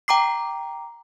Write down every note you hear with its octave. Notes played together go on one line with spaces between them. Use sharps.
G5 A#5 D6 C7